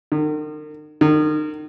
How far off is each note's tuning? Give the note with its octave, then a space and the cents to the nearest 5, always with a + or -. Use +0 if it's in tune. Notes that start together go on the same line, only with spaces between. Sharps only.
D#3 -40
D#3 -30